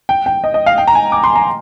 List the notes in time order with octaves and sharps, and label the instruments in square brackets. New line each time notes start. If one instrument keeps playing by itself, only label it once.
[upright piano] G5
G5
D#5
D#5
F5
G5
A#5
G#5
D6
C6
A#5